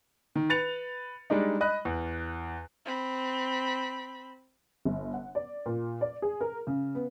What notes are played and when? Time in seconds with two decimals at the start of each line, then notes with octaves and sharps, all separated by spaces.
0.35 D#3
0.50 B4 A6 C#7 F7
1.30 G3 G#3 D4 D#4
1.61 D#5 B5 F#6
1.85 E2
2.85 C4 B5
4.85 G1
5.14 F#5
5.35 D5
5.66 A#2
6.01 D5
6.22 G#4
6.41 A#4
6.67 C#3
6.95 B3